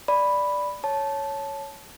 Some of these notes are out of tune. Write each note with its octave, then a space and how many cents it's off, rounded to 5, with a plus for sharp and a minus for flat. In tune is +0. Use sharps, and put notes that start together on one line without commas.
D5 +0 B5 +0
C#5 +0 A5 -10